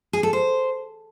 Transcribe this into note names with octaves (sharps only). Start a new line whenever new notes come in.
G#4
A4
C5